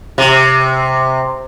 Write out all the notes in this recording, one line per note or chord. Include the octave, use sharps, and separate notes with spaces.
C3